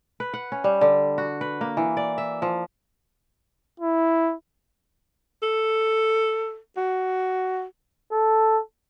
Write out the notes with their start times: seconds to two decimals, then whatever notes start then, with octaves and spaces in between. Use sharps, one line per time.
0.20 B4
0.34 F#5
0.52 C#4
0.64 G3
0.81 D3
1.18 F#4
1.41 B4
1.61 A#3
1.77 E3
1.97 D5
2.18 E5
2.42 F3
3.80 E4
5.42 A4
6.77 F#4
8.12 A4